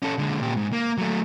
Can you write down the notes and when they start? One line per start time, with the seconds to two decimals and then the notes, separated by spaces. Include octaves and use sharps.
0.02 C#4 A4
0.18 D3 G#3
0.40 A#2 G4
0.57 G#2
0.73 A#3
0.98 F#3 A3